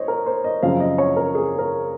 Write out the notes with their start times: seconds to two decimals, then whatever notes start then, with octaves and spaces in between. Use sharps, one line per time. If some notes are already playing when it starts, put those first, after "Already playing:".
Already playing: C5 C#5 D#5
0.08 A#4
0.26 C5
0.44 D#5
0.62 F#2 C#3 F3 C4 F5
0.80 D#5
0.98 C#5
1.17 A#4
1.35 G#4
1.59 A#4